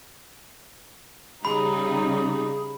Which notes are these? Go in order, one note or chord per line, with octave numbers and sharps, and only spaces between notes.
C#3 G3 D#4 G#4 B5